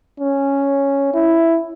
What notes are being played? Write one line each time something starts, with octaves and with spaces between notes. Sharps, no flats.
C#4
E4